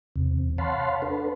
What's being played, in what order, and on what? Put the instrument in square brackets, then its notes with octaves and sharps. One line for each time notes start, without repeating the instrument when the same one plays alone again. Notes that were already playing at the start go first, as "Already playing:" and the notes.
[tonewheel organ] E2 C3
C#5 F5 F#5 A5 B5 C6
D4 A4 B4